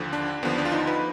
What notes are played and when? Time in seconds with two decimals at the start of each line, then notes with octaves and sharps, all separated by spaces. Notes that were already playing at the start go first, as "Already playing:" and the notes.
Already playing: D#2 D3 F3
0.13 D4
0.43 D#2 D3 F3 B3
0.58 D4
0.65 F4
0.72 D#4
0.87 B4